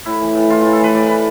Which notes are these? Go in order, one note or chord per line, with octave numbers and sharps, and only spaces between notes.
A2 E4
E3
A2
E3 F4
A2 F4
A4
E3 B4
A2 D5
E3 B4